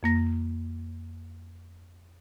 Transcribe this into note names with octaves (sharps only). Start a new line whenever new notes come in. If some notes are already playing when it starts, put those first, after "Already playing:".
F2 A#3 A#6